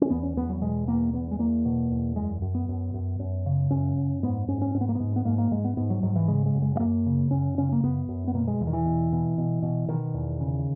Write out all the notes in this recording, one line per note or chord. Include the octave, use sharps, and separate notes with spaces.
C#4
E2 B3
C#4
E2 B3
F#3
B2 G#3
E2 A#3
E2 B3
G#3
E2 A#3
B2
E2
F#2 G#3
F#2
B3
F#2
F#2
F#2
C#3
F#2 C#4
F#2
G#2 B3
G#2 C#4
C#4
G#2 C#4
B3
A#3
G#2 B3
B3
G#2 A#3
A#3
G#2 G#3
B3
G#2 B3
F#3
G#2 F#3
E3
C#3 G#3
G#3
F#2
G#3
G#3
F#2 A#3
C#3
F#2 C#4
C#3 C#4
A#3
F#2 B3
F#2
B3
B2 A#3
G#3
E2 E3
D#3
E3
B2
B2
B2
B2
B2 D#3
E2
C#3